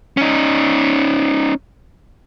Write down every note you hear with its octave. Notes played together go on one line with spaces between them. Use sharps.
C#4 D#4